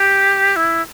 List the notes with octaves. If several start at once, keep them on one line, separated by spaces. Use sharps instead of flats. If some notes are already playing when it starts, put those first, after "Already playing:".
Already playing: G4
E4